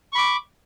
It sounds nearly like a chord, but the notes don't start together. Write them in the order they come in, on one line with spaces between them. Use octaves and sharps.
C#6 B5 D6